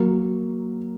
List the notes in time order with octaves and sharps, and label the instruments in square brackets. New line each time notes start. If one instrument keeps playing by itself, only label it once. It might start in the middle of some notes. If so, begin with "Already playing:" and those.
Already playing: [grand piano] F#3 A#3